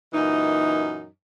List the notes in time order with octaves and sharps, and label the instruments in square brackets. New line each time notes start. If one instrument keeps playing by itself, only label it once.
[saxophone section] F#2 A#2 E3 D#4